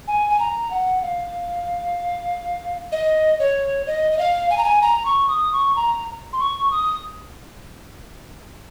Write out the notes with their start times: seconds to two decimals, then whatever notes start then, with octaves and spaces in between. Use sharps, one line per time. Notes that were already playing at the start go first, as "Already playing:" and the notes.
0.08 G#5
0.30 G#5
0.40 A#5
0.71 F#5
1.03 F5
2.92 D#5
3.40 C#5
3.87 D#5
4.12 D#5
4.19 F5
4.50 G#5
4.58 A#5
4.64 G#5
4.82 A#5
5.05 C#6
5.29 D#6
5.53 C#6
5.76 A#5
6.33 C6
6.40 C#6
6.71 D#6